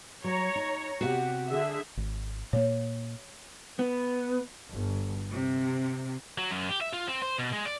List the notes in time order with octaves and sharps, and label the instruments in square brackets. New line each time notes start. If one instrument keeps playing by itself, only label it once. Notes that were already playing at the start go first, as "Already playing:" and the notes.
[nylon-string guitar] F#3 [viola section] C#5 A#5
[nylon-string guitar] D#4
[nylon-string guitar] C3 B3 [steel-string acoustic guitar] F#4 F#5 [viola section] G4
[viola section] D3 G#4 E5
[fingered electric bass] G#1
[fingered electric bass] A#2 A#3 [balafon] C#5
[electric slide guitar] B3
[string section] G1
C3
[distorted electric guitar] F#3
F#2
G4
E5
F4
C4
C5
B2
G#3
D5